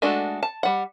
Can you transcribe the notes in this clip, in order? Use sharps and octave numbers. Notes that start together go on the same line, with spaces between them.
G#3 A3 D4 F#4 A4
A5
G3 F#5